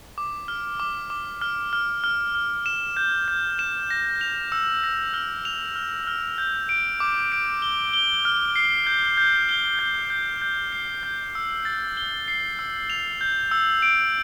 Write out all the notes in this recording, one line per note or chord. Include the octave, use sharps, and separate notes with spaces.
D6
F6
D6
D6
F6
F6
F6
F6
E7
G6
G6
E7
A#6
F7
E6
A#6
F6
F7
F6
F6
G6
D7
D6
D7
G7
G7
F6
C7
G6
G6
G7
G6
G6
G6
C7
G6
E6
A6
G7
C7
E6
F7
G6
E6
D7